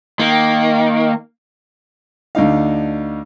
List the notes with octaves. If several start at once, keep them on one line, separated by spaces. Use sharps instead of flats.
D#3 A#3
D2 D3 D#4 F5